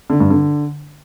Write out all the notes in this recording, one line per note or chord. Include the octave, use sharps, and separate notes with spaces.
D3
G2
D3